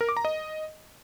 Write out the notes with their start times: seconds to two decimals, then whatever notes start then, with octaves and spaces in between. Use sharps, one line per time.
0.01 A#4
0.09 D6
0.17 A#5
0.25 D#5